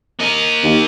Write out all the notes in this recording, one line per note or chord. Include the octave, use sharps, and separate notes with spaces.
A#3 D#5
D#2